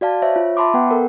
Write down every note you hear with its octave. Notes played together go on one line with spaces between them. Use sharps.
F#4 D5 F5 A5
C5 C#5 E5
F4
E5 A5 B5 C6 D6
B3 B4 F#5 G5
A4 A#4